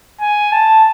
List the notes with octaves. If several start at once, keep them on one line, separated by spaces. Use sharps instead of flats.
G#5
A5